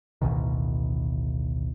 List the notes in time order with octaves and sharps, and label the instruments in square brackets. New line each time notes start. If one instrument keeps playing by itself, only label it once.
[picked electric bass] A1 D2 B2 D#3